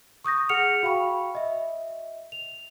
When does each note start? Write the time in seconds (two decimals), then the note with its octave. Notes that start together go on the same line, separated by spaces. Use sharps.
0.24 C#6 D#6 G6 A#6
0.49 G#4 F#5 F6 C#7 F7
0.83 F#4 F5 G5 B5 C#6
1.35 D#5 E5
2.32 F7